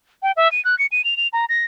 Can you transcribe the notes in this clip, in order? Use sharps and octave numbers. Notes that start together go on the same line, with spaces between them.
G5
E5
D#7
F#6
C#7
D#7
F7
F7
A#5
A#6